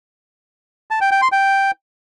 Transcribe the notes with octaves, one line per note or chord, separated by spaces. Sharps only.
A5
G5
G5
C6
G5